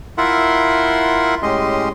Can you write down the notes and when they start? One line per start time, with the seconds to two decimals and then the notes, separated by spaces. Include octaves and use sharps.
0.18 E4 F4 A#4 E5 F#5 C6
1.42 A2 G#3 C#4 G4 D#5 C6